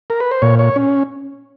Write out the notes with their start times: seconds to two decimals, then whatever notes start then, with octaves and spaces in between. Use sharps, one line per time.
0.10 A#4
0.20 B4
0.31 C5
0.42 A#2 C#5
0.59 C#5
0.76 C#4